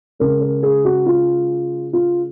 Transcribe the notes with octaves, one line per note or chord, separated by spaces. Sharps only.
C#3 G#3 A#4
A#4
G#4
F#4
F4
F4